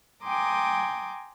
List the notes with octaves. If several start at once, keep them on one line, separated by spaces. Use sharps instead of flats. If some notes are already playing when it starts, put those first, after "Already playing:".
G5 G#5 A#5 C6 D6 D#6